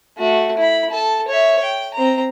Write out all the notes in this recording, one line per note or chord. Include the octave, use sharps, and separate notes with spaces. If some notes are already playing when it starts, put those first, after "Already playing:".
A3 F#4
E4 B5
A4 A5
C#5 E5
G5
C4 A#5